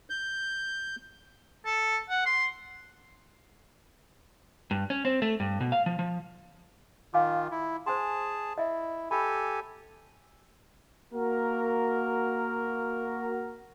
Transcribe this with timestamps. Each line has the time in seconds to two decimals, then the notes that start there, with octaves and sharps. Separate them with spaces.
0.10 G6
1.65 A4
2.09 F#5
2.26 C6
4.71 G2
4.90 C#4
5.05 C4
5.22 A3
5.40 G2
5.60 B2
5.72 F5
5.86 F3
5.99 F3
7.14 D#3 F4 F5 G#5 D6
7.51 E4
7.86 G#4 C5 G#5 A5 C6
8.58 E4 D#5 E5
9.11 G4 A4 G#5 B5
11.13 A#3 F#4 A#4